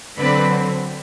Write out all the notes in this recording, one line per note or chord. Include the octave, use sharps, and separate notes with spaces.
D3 F#3 C4 B4 D5